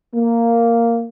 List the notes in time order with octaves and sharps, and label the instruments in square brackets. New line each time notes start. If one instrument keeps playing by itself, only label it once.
[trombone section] A#3